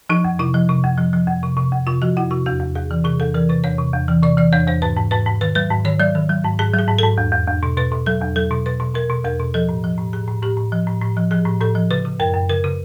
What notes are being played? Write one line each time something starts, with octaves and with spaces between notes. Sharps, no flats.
F3 D#4
F2
C3 E4
F3
C3
F2
F3
F3
F2
C3
C3
F2
C3 F4
F3 F#4
F2 E4
C3 F#4
E2 F#4
E2
E2 G#4
E3
C3 G#4
E2 A4
E3 A#4
C3 B4
E2 C#5
C3
E2
E3
C3 D5
E3 D5
E2 C#5
E2 C5
G#2 B4
G#2
G#2 B4
G#2
D#3 B4
F#3 B4
G#2
D#3 C#5
F#3 D5
D#3
F#3
G#2
G#2 G#4
F#3
G#4
G#2
G#2 A4
E2
E2
E2
B2
B2 B4
B2
F#3 A4
E2
F#3 A4
B2
B2 B4
B2
B2 A#4
B2
E2 A#4
B2
F3 A4
A2
F3
A2
A2 G#4
A2
A2 G4
A2
F3
A2
A2
F3
F3 G#4
A2
A2 A4
F3
C#3 B4
C#3
F#2 A#4
F#2
C#3 A#4
C#3